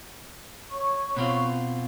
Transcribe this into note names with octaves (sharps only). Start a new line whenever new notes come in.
C#5 C#6
B2 C4 F4